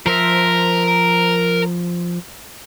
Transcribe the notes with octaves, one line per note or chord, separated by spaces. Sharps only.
F3 A#4 C5 E5